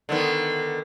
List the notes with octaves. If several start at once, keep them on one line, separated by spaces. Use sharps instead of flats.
D3 D#3 B3